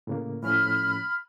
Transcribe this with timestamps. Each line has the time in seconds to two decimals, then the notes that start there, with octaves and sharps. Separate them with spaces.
0.07 A2 C#3 A#3
0.43 A2 F3 C#4 B5 F6